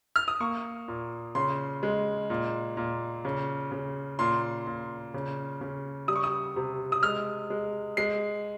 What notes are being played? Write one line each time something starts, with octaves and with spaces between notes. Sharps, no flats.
F6
D#6
A#3 C#6
A#2
C#3 C6
G#3
A#2
A#2
C#3
C#3
A#2 C6
A#2
C#3
C#3
G3 D#6
C#6
D#6
C3
D#6
G#3 F6
G#3
G#3 C7